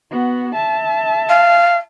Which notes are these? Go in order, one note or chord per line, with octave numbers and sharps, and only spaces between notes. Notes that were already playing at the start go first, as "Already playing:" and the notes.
B3 F#4
E5 A5
F5